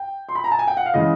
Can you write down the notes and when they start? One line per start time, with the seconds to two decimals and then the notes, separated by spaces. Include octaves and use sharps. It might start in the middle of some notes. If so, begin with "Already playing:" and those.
Already playing: G5
0.29 C6
0.35 B5
0.44 A#5
0.51 A5
0.59 G#5
0.67 G5
0.77 F#5
0.86 F5
0.94 C#3 E3 G#3 D#5